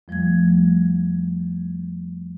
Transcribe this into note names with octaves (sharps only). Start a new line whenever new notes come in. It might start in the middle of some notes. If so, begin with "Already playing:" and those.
F2 F3 G3 A3 G#6